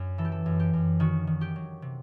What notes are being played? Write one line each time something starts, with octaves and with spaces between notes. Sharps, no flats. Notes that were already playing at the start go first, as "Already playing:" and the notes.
Already playing: F#2
E3 A4
G4
A4
F#2
G4
F#2
D#3 F#4
D#3
G4
F#3
C3